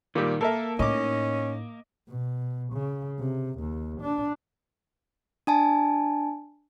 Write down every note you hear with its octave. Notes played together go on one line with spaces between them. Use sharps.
A#2 D#3 G3
A#3 A4 A#4 E5
A2 C#4 D#4 D#5 D6
B2
C#3
C3
D#2
D4
D4 G#5 A5